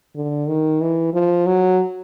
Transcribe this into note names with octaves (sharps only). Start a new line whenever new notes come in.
D3
D#3
E3
F3
F#3